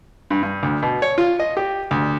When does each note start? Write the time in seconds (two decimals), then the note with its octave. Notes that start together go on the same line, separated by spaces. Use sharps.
0.30 G2
0.43 G2
0.63 D2
0.82 B2
1.02 C#5
1.18 F4
1.40 D#5
1.57 G4
1.91 D2